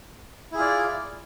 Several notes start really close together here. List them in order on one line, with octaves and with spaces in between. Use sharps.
E4 G#4 F4 D5